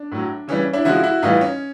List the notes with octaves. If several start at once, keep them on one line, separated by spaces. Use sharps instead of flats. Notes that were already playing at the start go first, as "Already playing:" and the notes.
Already playing: D4
A2 F#3
C#3 E3 G3 C#4
D4 E4
C#3 F3 G#3 E4 F#4
E4 F#4
A2 E3 G3 D#4 F4
C#4